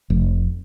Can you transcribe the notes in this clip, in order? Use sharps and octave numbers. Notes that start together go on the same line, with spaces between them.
F1